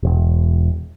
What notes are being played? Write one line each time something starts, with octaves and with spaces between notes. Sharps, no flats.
E1